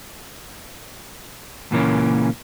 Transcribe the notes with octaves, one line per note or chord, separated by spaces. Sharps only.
C#2 A#2 E3 A#3 C#4